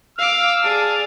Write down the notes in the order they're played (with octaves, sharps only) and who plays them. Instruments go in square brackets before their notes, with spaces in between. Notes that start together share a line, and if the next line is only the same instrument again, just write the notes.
[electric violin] F5 D6 [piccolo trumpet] E6 [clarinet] F6
[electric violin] G#4 D5 [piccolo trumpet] A5